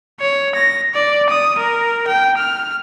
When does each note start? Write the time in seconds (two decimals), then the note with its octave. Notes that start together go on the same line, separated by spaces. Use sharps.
0.20 C#5
0.55 A#6
0.94 D5
1.29 D#6
1.58 A#4
2.07 G5
2.38 F6